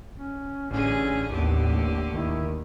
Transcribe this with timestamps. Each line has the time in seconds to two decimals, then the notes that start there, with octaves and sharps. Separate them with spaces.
0.17 C#4
0.71 A1 D3 C#4 G#4
1.29 D#2 A2 D3 B3 G4
2.10 D#2 D#3 E4